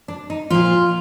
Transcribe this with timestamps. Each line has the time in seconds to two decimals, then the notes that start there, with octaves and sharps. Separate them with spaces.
0.08 D4
0.30 D#4
0.50 A#2 F3 F4